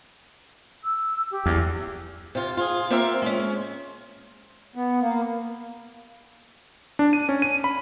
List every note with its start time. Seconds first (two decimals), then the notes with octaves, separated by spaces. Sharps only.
0.84 E6
1.31 G4
1.46 E2
2.35 C3 F4
2.57 F4 G#4
2.90 A#3 C4 F4 A#4 E5 F5
3.22 G#3 C#4
4.76 B3
5.01 A#3
6.99 D4
7.13 D#7
7.29 C#4
7.42 D#7
7.64 B5